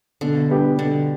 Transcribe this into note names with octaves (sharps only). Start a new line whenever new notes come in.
B2 D3
G3 B3 D4 G4
B2 D3